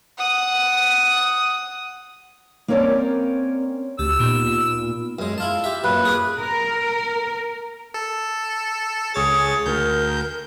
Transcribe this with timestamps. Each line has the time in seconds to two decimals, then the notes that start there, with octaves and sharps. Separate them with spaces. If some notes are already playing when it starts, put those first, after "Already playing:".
0.18 F#5 D#6
2.68 A#3 C4 C#4 A#4 C#5 D5
3.99 D2 G4 E6
4.19 A#2 B3 D#4 F4
5.19 F#2 G#3
5.38 E4 F4 A5
5.64 G4 E5
5.84 F#2 A#2 B4
6.05 G#4 D6
6.38 A#4
7.94 A4
9.14 C#2 G#4 C#5 A6
9.66 D2 A#4 G6